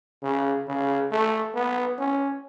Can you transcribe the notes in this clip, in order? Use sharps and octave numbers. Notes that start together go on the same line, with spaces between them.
C#3
C#3
A3
B3
C#4